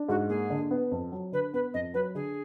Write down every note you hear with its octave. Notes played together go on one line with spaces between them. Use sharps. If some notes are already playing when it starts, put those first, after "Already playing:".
Already playing: D4
G#2 F#4
A#3 G#4
D3
B3
F2
F#3
D3 B4
B3 B4
F2 D#5
F#3 B4
D3 G#4